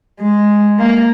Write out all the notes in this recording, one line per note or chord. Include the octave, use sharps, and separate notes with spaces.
G#3
A#3